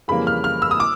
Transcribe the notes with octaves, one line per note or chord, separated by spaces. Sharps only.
F2 C#3 E3 G3 A#3 B5
F6
F6
E6
D#6
D6